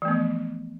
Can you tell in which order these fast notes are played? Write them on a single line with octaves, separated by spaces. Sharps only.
E3 A3 B3 F3